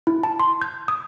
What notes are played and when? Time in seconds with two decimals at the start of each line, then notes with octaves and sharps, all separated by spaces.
0.07 E4
0.23 A5
0.40 C6
0.61 G6
0.88 D#6